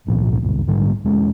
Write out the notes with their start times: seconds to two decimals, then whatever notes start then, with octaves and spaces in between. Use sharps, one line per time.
0.07 G#1 C#2 A#2 F3
0.42 F#1 C#2 G2
0.67 A#1 G#2 D3 G3
1.04 E1 G#3 C#4